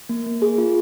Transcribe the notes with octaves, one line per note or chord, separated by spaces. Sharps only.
A#3
A#3
G#4
F4